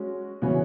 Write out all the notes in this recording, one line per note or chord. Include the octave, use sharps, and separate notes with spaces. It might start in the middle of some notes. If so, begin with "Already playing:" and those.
Already playing: G#3 C#4 F#4
C#3 E3 B3 F#4 C#5